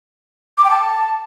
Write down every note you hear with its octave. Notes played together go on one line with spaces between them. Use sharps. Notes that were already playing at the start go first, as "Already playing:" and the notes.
D6
G5
A5